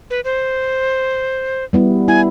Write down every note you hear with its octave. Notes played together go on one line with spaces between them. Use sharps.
B4
C5
G3 B3 E4
E4 G#5